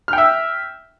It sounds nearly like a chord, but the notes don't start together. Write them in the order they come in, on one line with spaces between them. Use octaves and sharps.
F6 G5 E5